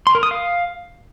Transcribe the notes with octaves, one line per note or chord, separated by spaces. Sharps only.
C6
A#4
D#6
F5